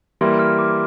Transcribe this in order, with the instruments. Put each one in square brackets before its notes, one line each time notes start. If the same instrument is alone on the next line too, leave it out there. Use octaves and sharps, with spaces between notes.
[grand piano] E3 G3 A#3 E4 [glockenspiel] C6
[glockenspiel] F6
D6